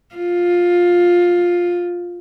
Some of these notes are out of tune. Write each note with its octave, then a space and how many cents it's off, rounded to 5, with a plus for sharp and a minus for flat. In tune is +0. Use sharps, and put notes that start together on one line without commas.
F4 +10